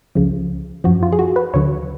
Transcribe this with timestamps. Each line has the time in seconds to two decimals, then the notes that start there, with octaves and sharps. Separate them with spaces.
0.15 C#2 C#3 F3
0.84 F#2 F3 F#4
1.03 F4
1.12 G#4
1.19 F#4
1.36 B4
1.54 D2 D3 F#3 C#5